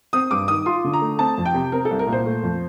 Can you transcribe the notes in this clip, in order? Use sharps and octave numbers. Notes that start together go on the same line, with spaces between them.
C4 D#6
G2 D6
D#3 D#6
F4 C6
D3
A#5
A3
C4 A5
F2
G5
C3
C4 A#4
A4
C2
A#4
A#2
C5
A3
F2